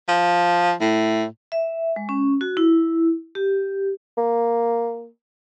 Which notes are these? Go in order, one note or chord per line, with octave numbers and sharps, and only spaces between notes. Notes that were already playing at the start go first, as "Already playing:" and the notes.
F3
A2
E5
G#3
C#4
F#4
E4
G4
A#3